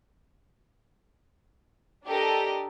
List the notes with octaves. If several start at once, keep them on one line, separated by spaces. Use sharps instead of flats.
D4 G4 A4 A#4 D#5